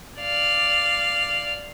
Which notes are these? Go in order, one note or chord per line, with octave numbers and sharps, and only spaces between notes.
D5 F5